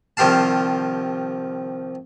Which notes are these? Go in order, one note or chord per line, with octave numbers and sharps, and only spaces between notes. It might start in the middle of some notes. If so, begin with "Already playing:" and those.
C2 D#3 F3 G4 F5 A5